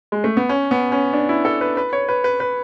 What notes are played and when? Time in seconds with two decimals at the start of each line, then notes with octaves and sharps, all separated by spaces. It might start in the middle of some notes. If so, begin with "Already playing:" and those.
0.12 G#3
0.24 A3
0.37 B3
0.49 C#4
0.71 B3
0.92 C#4
1.13 D4
1.29 E4
1.45 A4
1.61 B4
1.77 B4
1.93 C#5
2.09 B4
2.24 B4
2.40 B4